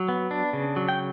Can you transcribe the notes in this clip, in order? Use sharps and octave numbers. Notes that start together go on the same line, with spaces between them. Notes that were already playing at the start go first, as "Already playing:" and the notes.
Already playing: F#3
B3
D4
C#3
F#3
G5